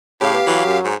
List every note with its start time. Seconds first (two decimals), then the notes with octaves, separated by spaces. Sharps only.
0.21 A2 C#3 G4 F5
0.34 B3
0.47 E3 F#3
0.66 F#2
0.84 G#2